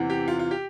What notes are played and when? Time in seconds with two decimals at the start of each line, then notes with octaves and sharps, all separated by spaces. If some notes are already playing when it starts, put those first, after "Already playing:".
Already playing: E2 C3 E3
0.10 G4
0.28 F4
0.39 F4
0.51 G4